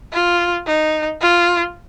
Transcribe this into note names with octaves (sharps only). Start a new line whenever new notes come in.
F4
D#4
F4